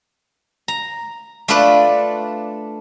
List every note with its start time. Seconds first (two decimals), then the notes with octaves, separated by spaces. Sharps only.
0.68 A#5
1.48 A3 D4 F4 A4 B4 D5